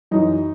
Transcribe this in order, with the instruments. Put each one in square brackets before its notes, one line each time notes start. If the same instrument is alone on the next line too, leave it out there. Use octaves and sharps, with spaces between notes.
[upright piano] F#2 E3 D#4